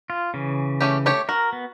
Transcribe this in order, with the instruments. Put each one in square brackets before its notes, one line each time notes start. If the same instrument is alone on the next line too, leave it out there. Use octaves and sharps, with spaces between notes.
[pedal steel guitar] F4
C#3 E3
[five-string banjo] A3 C#4 G4
A3 G4 C#5
[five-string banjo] F#4 [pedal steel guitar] A#4
[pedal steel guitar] B3